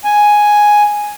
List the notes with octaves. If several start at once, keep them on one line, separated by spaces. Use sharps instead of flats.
G#5